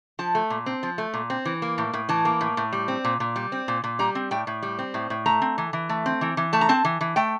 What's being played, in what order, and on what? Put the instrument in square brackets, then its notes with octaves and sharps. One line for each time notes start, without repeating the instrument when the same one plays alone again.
[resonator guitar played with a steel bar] F3 A5
A3
A#2
C4
F3
A3
A#2
C4
E3
A#3
A2
A2
E3 A5
A#3
A2
A2
G3
C4
A#2
A#2
G3
C4
A#2
A#2
G3 A#5
C4
A2 G5
A2
G3
C4
A2
A2
A3 A#5
C4
E3
E3
A3
C4
E3
E3
A3 A5
A#5
C4 A5
E3
E3
A3 G5